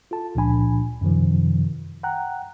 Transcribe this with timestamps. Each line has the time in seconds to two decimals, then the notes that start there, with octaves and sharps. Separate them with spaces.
0.11 F4 A4 A5
0.35 C#2 A#2 F3 D4 G#5 B5
1.01 F#2 C3 D#3 F3
2.03 F#5 G5 A#5 F#6